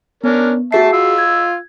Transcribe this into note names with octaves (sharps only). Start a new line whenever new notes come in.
B3 C#4 D4 A#4
F#4 G#4 E5 A5 C7
F4 E6
G#6